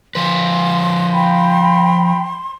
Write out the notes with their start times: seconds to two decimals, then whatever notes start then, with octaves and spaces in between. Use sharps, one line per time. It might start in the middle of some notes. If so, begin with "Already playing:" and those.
0.15 F3 B4 C6
1.12 G5 A#5 B5